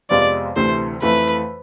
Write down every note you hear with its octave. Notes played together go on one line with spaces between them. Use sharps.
F2 C3 G#3 B3 F4 D5
D2 C3 E3 A3 C5
F2 E3 A3 B4